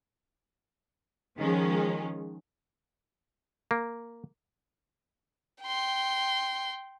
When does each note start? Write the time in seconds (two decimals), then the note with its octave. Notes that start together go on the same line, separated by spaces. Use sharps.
1.38 D#3 F3 G#3 C#4
3.71 A#3
5.63 G5 C6